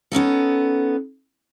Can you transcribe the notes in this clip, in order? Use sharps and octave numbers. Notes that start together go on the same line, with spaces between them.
B3 C#4 D#4 A4